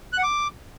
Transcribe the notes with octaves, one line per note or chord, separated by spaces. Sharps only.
F#6
F#5
D6